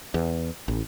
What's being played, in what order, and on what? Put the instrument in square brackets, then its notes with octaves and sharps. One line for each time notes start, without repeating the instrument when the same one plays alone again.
[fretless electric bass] E2
A1